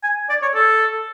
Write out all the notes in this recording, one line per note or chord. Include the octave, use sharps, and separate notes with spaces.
G#5
D5
C#5
A4